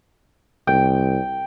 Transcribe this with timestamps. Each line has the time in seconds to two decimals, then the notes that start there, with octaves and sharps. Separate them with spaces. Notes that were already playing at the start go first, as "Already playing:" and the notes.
0.67 C2 G5